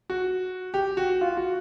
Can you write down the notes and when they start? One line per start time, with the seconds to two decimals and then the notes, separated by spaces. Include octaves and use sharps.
0.10 F#4
0.74 G4
0.97 F#4
1.21 F4
1.37 F#4